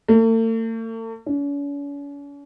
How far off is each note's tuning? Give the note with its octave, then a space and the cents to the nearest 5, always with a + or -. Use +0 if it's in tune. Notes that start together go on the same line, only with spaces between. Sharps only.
A3 +45
C#4 +45